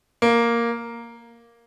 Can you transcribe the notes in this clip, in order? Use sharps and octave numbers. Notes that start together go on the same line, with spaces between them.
A#3